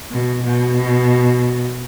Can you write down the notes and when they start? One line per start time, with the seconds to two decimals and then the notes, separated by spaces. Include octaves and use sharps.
0.11 B2
0.44 B2